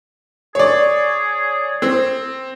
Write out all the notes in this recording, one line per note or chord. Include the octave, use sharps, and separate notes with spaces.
G#4 C#5 D5
C4